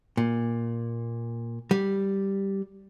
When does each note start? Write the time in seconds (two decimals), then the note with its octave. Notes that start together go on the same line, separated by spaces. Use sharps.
0.17 A#2
1.71 G3